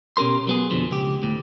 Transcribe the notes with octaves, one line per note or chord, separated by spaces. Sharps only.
B2 C#4 G4 A#4 C6
F#3 B3 G#4
F2 B2 D3 F3
C#2 G4
D2 A2